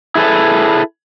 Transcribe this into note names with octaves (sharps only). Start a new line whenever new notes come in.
E4 G#4 A4 B4